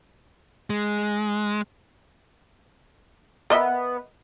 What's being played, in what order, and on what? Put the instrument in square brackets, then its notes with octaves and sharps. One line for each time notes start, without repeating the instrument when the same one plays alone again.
[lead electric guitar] G#3
[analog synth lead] B3 [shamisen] A#4 D#5 E5